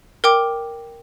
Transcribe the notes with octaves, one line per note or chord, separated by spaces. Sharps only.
A#4 G5 D6